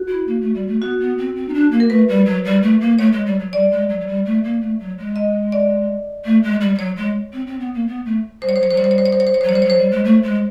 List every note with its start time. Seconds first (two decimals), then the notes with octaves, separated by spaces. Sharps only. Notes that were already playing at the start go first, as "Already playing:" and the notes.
Already playing: F#4
0.08 E4
0.27 A#3
0.41 A3
0.55 G3
0.68 A3
0.81 B3 F#4
1.00 B3
1.18 C4
1.36 C4
1.48 D#4
1.54 D4
1.71 A#3
1.80 A#4
1.90 A3 B4
2.08 G3
2.26 F#3
2.45 G3
2.62 A3
2.81 A#3
2.99 A3 C#5
3.12 G#3
3.26 G3
3.39 F#3
3.53 G3 D5
3.71 G#3
3.89 F#3
4.00 F#3
4.07 G3
4.25 A3
4.44 A#3
4.61 A3
4.80 F#3
4.98 G#3
5.16 D#5
5.52 D5
6.25 A3
6.43 G#3
6.61 G3
6.75 G3
6.78 F#3 C#5
6.96 G#3
7.33 C4
7.47 C4
7.60 B3
7.74 A#3
7.87 B3
8.05 A3
8.42 G3 C5
8.49 C#5
8.56 C5
8.60 F#3 C#5
8.71 F#3 C5
8.77 G3 C#5
8.84 C5
8.91 C#5
8.98 C5
9.06 C#5
9.13 C5
9.20 C#5
9.27 C5
9.34 C#5
9.41 C5
9.44 F#3
9.49 G3 C#5
9.55 C5
9.62 F#3 C#5
9.70 C5
9.78 G3
9.91 G#3
10.04 A3
10.23 G#3